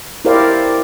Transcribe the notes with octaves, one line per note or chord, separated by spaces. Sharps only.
E4 G4 A#4 C5 D5 F5